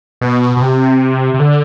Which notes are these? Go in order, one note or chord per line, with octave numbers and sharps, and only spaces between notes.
B2
B2
C3
C3
D3